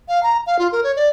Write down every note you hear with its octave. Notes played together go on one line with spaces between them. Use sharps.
F5
A#5
F5
F4
A#4
C#5
D5